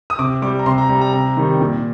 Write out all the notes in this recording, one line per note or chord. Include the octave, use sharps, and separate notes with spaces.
D#6
C3 D6
G3 D6
A#5
C3 C6
A#5
G3 A#5
A#5
C3 A#5
D#3 G3
A#2